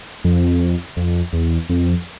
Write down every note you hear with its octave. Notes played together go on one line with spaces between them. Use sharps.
F2
F2
E2
F2